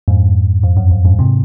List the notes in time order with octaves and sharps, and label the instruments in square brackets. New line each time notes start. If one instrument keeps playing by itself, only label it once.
[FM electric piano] F2 G#2
F2
F#2
F2
F2 G#2
G#2 C3